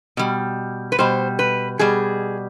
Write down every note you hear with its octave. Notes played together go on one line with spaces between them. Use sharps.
B2 G3
B4
B2 G3 C5
B4
B2 G3 G#4